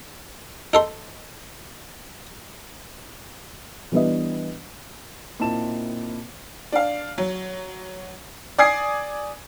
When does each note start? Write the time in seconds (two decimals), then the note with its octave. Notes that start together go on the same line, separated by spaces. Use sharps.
0.73 D#4 A4 C6
3.92 E3 G3 B3 D4 B4 D#5
5.40 A#2 C4 D#4 E4 A5 E7
6.72 D4 F5
7.18 F#3
8.58 D5 G#5 D#6 G#6 C7